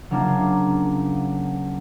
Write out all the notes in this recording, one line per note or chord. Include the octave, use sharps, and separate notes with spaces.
C#3 F#3 A#3 D4 F4